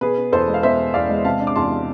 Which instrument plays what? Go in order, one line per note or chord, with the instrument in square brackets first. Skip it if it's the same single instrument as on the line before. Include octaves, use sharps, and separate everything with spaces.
[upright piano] B2 G#4 B4
B3
E2 A4 C5
G#3
F5
B2 C5 E5
B3
E2 D5 F5
G#3
C3 F5 A5
D4
D6
E2 A5 C6
G#3